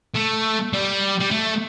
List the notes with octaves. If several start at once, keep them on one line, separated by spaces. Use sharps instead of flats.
A3
G3
G3
A3